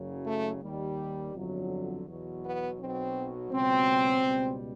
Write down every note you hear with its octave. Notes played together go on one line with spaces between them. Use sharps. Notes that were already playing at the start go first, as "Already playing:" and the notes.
Already playing: F#1 F#2 C#3 F#3
A3
D#2 D#3 G3
G1 F2 D3 F#3
E2 B2 F#3
B3
B1 B2 F#3 C4
C#2 B2 F#3 C4
C#2 B2 G3